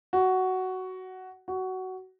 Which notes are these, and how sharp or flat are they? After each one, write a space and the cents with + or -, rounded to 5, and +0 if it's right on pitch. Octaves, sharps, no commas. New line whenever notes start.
F#4 +10
F#4 +15